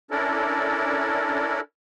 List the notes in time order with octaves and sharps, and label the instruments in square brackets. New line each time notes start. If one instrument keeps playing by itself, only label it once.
[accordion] C#4 D4 E4 A4 A#4 D5